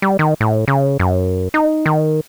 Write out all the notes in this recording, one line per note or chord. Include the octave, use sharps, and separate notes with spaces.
G3
D#3
A2
C#3
F#2
D#4
D#3